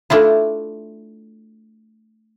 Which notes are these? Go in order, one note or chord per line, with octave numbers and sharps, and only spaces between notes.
A3 D4 E4 F4